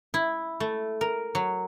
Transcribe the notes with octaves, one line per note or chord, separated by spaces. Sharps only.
E4
A3
A#4
F#3